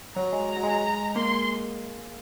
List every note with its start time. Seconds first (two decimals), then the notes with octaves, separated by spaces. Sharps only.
0.16 F#3 A#5
0.33 G#3
0.49 G#3
0.57 F#3
0.63 G#3
1.15 A#3 C6